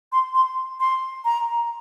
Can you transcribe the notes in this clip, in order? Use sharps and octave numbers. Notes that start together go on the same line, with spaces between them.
C6
C6
C6
A#5